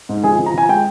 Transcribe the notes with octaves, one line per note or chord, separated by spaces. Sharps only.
G#2
F3 G#4 G#5
F3
A#5
F3 G#5
G#3 G5